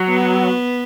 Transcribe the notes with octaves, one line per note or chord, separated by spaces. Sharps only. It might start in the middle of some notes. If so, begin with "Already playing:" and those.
Already playing: F#3
B3